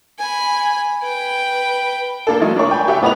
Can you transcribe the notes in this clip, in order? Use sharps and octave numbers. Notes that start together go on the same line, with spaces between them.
G#5 B5
B4 G5
A#3 D4 A4
E3 F#3 G#3 A3 D#4 E4
D4 A#4 C#5 D5
G5 G#5 B5
G4 E5 F#5 G5
A2 B3 B4 D#5 B5 F7